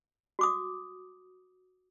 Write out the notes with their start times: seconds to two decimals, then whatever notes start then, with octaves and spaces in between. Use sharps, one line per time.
0.39 F#4 D6 D#6